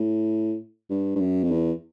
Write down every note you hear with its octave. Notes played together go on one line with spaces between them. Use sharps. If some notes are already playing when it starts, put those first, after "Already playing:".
Already playing: A2
G2
G2
F#2
F2
E2